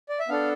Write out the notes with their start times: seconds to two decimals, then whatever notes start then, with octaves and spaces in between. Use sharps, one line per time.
0.09 D5
0.19 E5
0.28 B3 D4 A4 F5